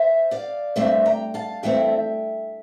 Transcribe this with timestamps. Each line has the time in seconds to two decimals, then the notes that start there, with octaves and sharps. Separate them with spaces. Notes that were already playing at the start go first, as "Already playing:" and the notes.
Already playing: C5 E5
0.31 D5 F5
0.76 G2 D3 A3 C4 C5 E5
1.06 G5 A#5
1.34 F5 A5
1.63 G2 E3 A3 C4 E5 G5